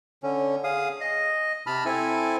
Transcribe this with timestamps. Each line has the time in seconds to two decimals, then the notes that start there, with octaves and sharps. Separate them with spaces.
0.23 D3 C#4
0.64 G#4 F5 D#6
1.01 D#5
1.67 C3 A5 B5 F6
1.86 C4 E4 A4 G#5